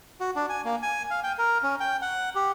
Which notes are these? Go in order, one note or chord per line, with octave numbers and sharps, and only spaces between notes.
F#4
D4
G#5
A#3
G#5
F5
G5
A#4
C#4
G5
F#5
G4